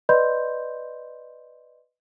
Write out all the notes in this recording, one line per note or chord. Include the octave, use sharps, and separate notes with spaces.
B4 D5 D#5 B5 C6 G6